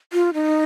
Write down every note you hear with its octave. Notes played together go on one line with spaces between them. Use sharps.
F4
D#4